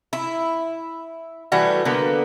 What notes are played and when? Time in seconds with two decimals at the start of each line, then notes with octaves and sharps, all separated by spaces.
0.13 E4
1.52 E3 G3 A3 F#4
1.85 D3 A#3 B3